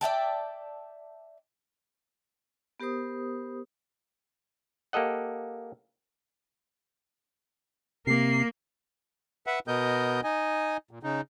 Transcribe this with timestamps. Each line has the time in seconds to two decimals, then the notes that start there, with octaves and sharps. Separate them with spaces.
0.01 D5 E5 G5 A5
2.80 B3 G4 A#4 C5 D#6
4.93 A#3 G4 A4 D#5 F#5
8.07 C3 A#3 C7
9.47 B4 E5 F#5
9.68 B2 B3 A#4 D#5 G6
10.24 D#4 D#5 G#5
10.91 A#2
11.03 C#3 D#4